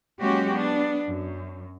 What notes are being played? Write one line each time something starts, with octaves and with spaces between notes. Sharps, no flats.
F#3 G#3 A#3 C#4 F#4 G4
B3 D4
F#2